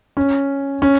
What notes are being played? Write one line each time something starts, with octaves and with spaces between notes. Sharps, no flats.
C#4
C#4